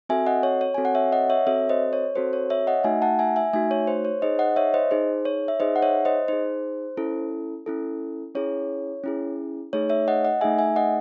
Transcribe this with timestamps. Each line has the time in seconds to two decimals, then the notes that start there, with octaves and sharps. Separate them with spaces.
0.09 C4 F#4 A4 E5 G#5
0.26 D#5 F#5
0.43 C#5
0.61 C#5
0.74 C4 F#4 A4 G#5
0.85 F#5
0.95 C#5 E5
1.12 D#5 F#5
1.30 C#5 E5
1.47 C4 F#4 A4 C#5 E5
1.69 C5 D#5
1.93 C#5
2.15 C4 F#4 A4 C5
2.33 C#5
2.50 C#5 E5
2.67 D#5 F#5
2.84 A3 D#4 F#4 E5 G#5
3.02 F#5 A5
3.19 E5 G#5
3.36 E5 G#5
3.53 A3 D#4 F#4 E5 G#5
3.71 C#5
3.87 C5
4.05 C#5
4.22 D#4 G#4 C5 D#5
4.39 D#5 F#5
4.56 C#5 E5
4.74 C5 D#5
4.91 D#4 G#4 C5
5.25 C#5
5.48 E5
5.60 D#4 G#4 C5 D#5
5.76 F#5
5.82 C#5 E5
6.05 C5 D#5
6.28 D#4 G#4 C5
6.97 C#4 E4 A4
7.66 C#4 E4 A4
8.35 C#4 E4 G#4 C#5
9.04 C#4 E4 G#4
9.73 A3 D#4 G#4 C#5
9.89 C#5 E5
10.08 D#5 F#5
10.25 D#5 F#5
10.41 A3 D#4 G#4 E5 G#5
10.58 E5 G#5
10.76 D#5 F#5